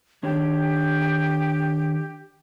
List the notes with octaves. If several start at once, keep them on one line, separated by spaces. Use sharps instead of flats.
D#3 D4 G4 C#5